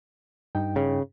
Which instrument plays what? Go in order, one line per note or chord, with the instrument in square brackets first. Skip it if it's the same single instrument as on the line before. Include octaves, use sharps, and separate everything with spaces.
[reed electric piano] G2 D#4 G5
[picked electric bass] C#3